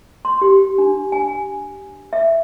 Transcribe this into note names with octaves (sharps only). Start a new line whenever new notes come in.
C6
G4
D4
G#5
E5